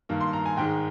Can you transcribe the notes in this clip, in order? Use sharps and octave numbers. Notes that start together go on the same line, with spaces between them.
G2 D#3 A#3
C6
A#5
G#5
G#2 D#3 G#3 G5